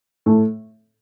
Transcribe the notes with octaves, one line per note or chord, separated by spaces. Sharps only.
A2 A3